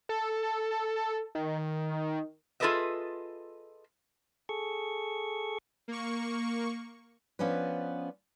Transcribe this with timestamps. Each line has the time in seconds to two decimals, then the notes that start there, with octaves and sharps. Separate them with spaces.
0.09 A4
1.35 D#3
2.60 F4 G#4 A4 B4 D#5 E5
4.49 G#4 A4 C#6
5.88 A#3 C#6
7.39 F3 B3 C#4 D4 B4